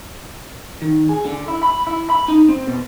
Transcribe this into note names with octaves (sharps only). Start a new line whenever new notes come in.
D#3
G#4
D3
E4
B5
E4
B5
D#4
C4
B2